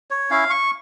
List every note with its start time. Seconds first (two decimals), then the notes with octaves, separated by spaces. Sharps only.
0.10 C#5
0.30 C#4 E4 F5
0.50 C#6